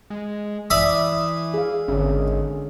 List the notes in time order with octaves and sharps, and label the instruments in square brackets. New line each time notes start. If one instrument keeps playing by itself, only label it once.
[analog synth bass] G#3
[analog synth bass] E3 [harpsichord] D5 E5 D#6
[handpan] G#4 F5
[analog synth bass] G#1 [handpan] D3 C#4